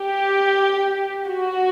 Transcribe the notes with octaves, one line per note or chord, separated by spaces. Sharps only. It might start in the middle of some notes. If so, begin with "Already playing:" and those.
Already playing: G4
F#4